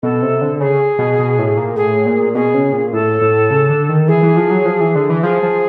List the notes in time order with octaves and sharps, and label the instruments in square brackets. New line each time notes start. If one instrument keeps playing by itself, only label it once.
[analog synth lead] B2 [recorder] A4
[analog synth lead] C3
D3
[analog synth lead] C#3 [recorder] G#4
[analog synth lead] B2
B2
A2
A#2
[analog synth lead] A2 [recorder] G#4
[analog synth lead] A#2
[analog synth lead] B2 [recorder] G#4
[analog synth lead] C#3
A#2
[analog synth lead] A2 [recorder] A4
[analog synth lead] A2
C#3
D3
D#3
[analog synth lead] E3 [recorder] G#4
[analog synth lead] E3
F3
F#3
F3
E3
D3
E3
[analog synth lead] F3 [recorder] G#4
[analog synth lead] F3